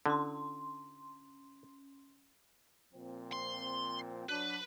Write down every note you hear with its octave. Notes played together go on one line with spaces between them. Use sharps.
D3 C#4 C6
A#2 F3 C4
C6
F#3 D4 B4